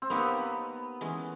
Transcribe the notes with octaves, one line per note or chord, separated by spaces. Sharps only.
C4
A#3 B3 D#4 G4 A#4 C#5
E3 G#3 C#4